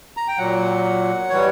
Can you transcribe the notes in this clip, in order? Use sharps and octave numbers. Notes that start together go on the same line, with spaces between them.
A#5
G5
A#2 F#3 F#5
E3 G3 C#5